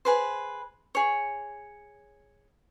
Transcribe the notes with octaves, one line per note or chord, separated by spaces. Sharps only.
G#4 B4 C5
G#4 C#5